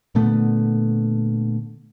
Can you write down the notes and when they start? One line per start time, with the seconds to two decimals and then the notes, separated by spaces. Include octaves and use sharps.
0.15 A#2 D3 A3 B3